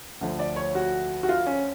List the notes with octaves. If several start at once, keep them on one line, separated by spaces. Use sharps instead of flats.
D2 D3 F3
D5
C#5
F#4
F#4
F4
C#4